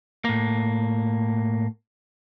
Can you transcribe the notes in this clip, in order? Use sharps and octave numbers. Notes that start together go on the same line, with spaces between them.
A2 A#3